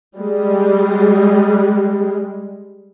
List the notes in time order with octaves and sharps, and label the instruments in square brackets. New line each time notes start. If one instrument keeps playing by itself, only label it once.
[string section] G3 G#3